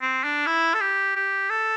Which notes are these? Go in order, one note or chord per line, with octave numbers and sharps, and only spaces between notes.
C4
D4
E4
A4
G4
G4
A4